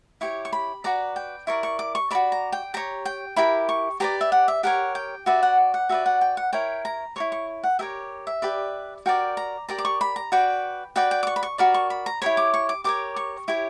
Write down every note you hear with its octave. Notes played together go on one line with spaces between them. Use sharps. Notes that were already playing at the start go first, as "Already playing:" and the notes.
E4 G4 C#5 C#6
C#6
B5
F#4 B4 D5 A#5
G5
E4 A#4 D5 C#6
C#6
D6
C#6
F#4 A#4 D5 B5
A#5
G5
G4 C#5 A#5
G5
E4 G4 A#4 B5
C#6
G4 B4 D5 A#5
E5
F#5
E5
G4 A#4 C#5 F#5
G5
F#4 B4 D5 E5
F#5
F#5
F#4 B4 D5 E5
F#5
G5
F#5
E4 A#4 C#5 G5
A#5
E4 A#4 C#5 C#6
C#6
F#5
G4 A#4 C#5 E5
E5
G4 B4 D5
F#4 A#4 D5 G5
A#5
G4 A#4 D5 A#5
D6
C#6
B5
A#5
F#4 B4 D5 G5
F#4 B4 D5 G5
G5
D6
C#6
B5
C#6
F#4 A#4 D5 B5
C#6
B5
A#5
E4 G4 A#4 C#5 B5
D6
C#6
D6
G4 A#4 C#5 D6
C#6
E4 G4 C#5